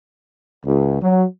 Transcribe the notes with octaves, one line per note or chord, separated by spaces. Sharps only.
C#2
F#3